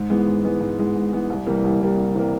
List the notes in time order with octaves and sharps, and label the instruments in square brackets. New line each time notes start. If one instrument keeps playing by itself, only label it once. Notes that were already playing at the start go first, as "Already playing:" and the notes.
Already playing: [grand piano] G#2
E3 G#3 B3
G#2
E3 G#3 B3
G#2
E3 G#3 B3
G#2
E3 G#3 B3
C2
C3 E3 G3 A#3
C2
C3 E3 G3 A#3
C2
C3 E3 G3 A#3